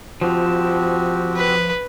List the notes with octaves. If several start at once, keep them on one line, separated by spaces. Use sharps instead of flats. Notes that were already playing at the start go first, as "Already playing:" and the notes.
F3 C4 F#4 G4
B4